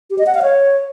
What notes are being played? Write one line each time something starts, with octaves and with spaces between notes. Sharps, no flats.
G4
D#5
F#5
F5
C#5